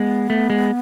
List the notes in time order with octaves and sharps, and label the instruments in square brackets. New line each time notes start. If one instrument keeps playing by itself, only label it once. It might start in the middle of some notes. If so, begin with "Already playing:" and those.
Already playing: [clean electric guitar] G#3 [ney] B3
[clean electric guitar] A3
G#3